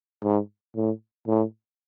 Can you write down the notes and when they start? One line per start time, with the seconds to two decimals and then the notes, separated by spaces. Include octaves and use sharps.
0.23 G#2
0.75 A2
1.27 A2